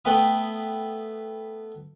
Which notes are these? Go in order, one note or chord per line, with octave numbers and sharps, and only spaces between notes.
A3 B3 G5 B5 D#6